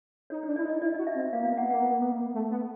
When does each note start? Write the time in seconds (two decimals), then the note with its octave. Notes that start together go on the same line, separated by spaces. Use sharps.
0.30 D#4 C#5
0.43 D4 C#5
0.56 E4 D5
0.65 D#4
0.69 D#5
0.82 E4 D5
0.94 F#4 D#5
1.07 E5
1.15 C4
1.20 E5
1.33 A#3 F5
1.43 B3 F5
1.52 A#3
1.58 F#5
1.62 B3
1.70 A#3 F#5
1.82 B3
1.92 A#3
2.02 B3
2.12 A#3
2.34 A3
2.51 B3